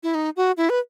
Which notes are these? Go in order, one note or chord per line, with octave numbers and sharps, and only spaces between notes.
E4
D#4
F#4
E4
B4